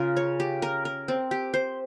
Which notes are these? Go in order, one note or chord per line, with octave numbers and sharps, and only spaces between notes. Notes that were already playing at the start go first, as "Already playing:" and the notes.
Already playing: C#3 F4 A#4
C#5
G4
A#4
A#4
C4
G4
C5